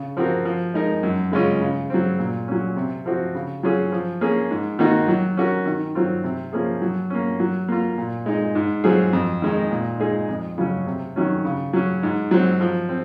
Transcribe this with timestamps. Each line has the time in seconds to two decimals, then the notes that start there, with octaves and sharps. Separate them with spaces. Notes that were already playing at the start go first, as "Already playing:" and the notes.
Already playing: C#3
0.17 F3 C4 F#4 A#4
0.45 F3
0.74 G#3 D#4 A#4
1.03 F#2
1.32 C#3 G#3 C#4 F4
1.61 C#3
1.90 F#3 C4
2.19 A#2
2.48 F#3 C#4
2.76 C3
3.06 F3 C4 F#4
3.35 C#3
3.63 F#3 C#4 F4 G#4
3.92 F3
4.21 A#3 C#4 G#4
4.51 G#2
4.79 D#3 A#3 D#4 F#4
5.08 F#3
5.37 C#4 F#4 A#4
5.66 D#3
5.95 F#3 C4 F4
6.24 C3
6.53 F3 A#3 C#4 G#4
6.82 F#3
7.10 A#3 C#4
7.40 F#3
7.68 A#3 F4
7.98 A#2
8.26 G#3 D#4
8.55 G#2
8.84 F#3 C4 F4 G#4
9.13 F2
9.42 D#3 G#3 D#4
9.71 A#2
10.00 G#3 D#4 G#4
10.29 F2
10.58 C#3 F#3 C#4
10.87 C3
11.16 D#3 F#3 C#4
11.45 C#3
11.73 F#3 C#4
12.03 G#2
12.31 F#3 C4
12.61 F3
12.89 C4